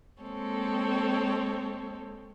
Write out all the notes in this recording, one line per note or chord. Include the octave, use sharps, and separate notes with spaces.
G#3 A#3 C4 A4 C#5